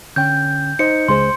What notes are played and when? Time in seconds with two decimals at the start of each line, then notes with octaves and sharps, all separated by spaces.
0.16 D3 C#4 G5 G6
0.79 D#4 C5 D#5 C#7
1.08 C#2 G#3 C5 C6